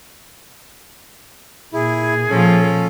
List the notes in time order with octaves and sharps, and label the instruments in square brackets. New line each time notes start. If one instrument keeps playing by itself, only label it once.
[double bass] A#2 [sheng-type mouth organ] E4 [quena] G#4
[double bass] A#2 [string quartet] F3 F4 [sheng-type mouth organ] C#4 A4